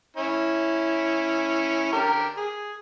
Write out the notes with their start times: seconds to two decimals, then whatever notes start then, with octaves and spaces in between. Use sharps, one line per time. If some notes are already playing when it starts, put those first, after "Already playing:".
0.17 C#4 E4
1.92 D3 G4 A#4
2.37 G#4